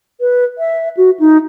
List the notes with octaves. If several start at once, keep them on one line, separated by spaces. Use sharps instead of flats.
B4
E5
F#4
D#4